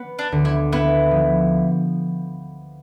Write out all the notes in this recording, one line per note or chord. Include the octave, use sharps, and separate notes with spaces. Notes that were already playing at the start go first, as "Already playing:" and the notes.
Already playing: B3
D4
D2
E4
B3 E4
F3